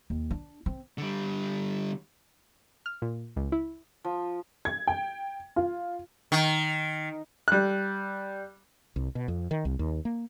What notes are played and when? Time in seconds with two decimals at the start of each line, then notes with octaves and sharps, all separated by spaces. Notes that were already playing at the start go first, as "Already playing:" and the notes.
0.10 D#2
0.31 D4
0.66 C4
0.98 D3 G3
2.86 F6
3.02 A#2
3.36 C#2
3.52 E4
4.04 F3
4.65 G#6
4.87 G5
5.56 F4
6.32 D#3
7.48 G3 F#6
8.96 C2
9.15 B2
9.28 F2
9.51 D#3
9.65 C2
9.79 D#2
10.05 A#3